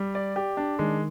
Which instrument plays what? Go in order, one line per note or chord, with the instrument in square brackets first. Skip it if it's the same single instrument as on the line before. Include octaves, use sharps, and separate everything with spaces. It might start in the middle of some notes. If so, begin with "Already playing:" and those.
Already playing: [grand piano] G3
D5
G4
D4
[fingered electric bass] D#3 [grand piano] G#3